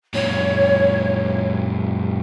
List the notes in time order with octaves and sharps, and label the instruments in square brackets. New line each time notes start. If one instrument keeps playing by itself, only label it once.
[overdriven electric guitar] F#2 A#2 [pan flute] C#5